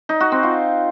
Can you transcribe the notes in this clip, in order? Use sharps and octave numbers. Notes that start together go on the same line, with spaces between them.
D#4
F#4
C4
F4